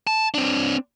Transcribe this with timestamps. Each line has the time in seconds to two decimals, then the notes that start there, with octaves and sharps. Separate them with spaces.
0.07 A5
0.34 C4 D4